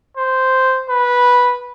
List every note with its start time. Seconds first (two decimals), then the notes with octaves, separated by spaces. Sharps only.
0.17 C5
0.89 B4